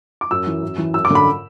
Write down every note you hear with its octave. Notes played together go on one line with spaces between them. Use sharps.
D6
F#2 E6
E3
F#2
E3
F#2 E6
D6
D3
B5